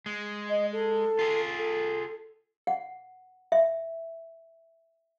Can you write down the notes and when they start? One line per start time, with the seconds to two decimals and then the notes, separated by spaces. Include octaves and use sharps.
0.06 G#3
0.49 D#5
0.72 A4
1.19 F4 G#4
1.58 A4
2.67 F#5
3.52 E5